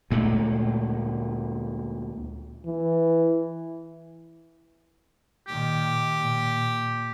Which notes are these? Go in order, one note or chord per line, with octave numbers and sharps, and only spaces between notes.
D2 A#2 G#3 A3
E3
A#2 D#3 G4
A#2